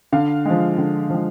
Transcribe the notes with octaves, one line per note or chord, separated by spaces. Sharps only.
D3 F5
F3 G#3
D3
F3 G#3